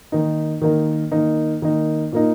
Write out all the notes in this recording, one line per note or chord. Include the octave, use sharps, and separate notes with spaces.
D#3 A#3 D#4
D#3 A#3 D#4
D#3 A#3 D#4
D#3 A#3 D#4
A#2 A#3 D#4